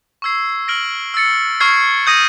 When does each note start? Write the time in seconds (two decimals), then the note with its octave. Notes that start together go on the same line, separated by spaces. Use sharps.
0.22 C#6 E6 G#6 C7
0.68 F6 A#6 D7 F#7
1.14 E6 A6 C#7
1.60 C#6 F6 G#6 C7
2.07 D#6 G6 A#6 D#7